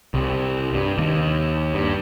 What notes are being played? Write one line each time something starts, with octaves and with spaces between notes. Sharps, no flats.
C2
G2
D#2
G2